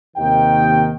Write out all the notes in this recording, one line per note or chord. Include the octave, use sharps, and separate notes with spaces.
D#2 C3 D#3 G5